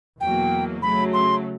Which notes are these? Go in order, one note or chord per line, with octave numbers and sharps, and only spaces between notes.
E2 B2 F#3 A#3 G5
C#3 F#3 A3 B5
C6